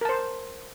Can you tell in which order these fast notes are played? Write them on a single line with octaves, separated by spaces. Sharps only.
A#4 A5 C5